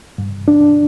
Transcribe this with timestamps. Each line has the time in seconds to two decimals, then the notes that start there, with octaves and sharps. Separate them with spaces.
0.18 G2
0.48 D4